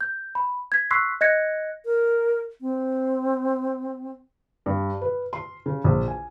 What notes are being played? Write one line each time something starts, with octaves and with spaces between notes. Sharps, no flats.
G6
B5
G#6 B6
C6 C#6 E6 F#6 B6 C7
D#5 F#6 G#6 A#6 C#7
A#4
C4
G2
B4
C6
C#3
A#1
G#5